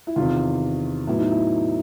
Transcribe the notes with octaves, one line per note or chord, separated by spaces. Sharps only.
E4
E2 C3 D#3 F4
A2 F#3 B3 E4
D#4
E4